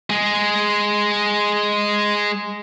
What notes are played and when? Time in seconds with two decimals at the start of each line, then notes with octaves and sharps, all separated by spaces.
0.10 G#3 G#4